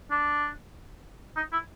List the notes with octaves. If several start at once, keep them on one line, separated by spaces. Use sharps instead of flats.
D4
D#4
E4